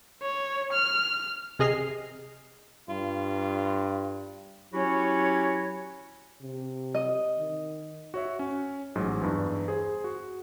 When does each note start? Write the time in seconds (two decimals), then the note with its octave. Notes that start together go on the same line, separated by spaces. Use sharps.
0.22 C#5
0.72 F6
1.59 C3 G#4 D#5 F6 C7
2.89 G2 F4
4.74 F#3 C#4 E4 F#4 G4 C#5
6.42 C3
6.95 D#5
7.39 D#3
8.14 F#4 C#5 E5
8.39 C#4
8.95 A1 G#2 F#3
9.21 E2 G2
9.68 G#4 C5
10.04 F#4